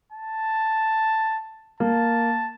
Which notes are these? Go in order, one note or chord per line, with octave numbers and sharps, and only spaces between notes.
A5
A#3 A5